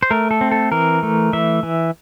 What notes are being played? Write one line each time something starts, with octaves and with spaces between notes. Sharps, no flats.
C5
A3 A#4
A4
C4
A4
E3 A#4
A3
E3 E5
E3